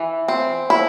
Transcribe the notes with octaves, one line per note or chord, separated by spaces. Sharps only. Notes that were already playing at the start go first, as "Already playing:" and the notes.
Already playing: E3
C4
E4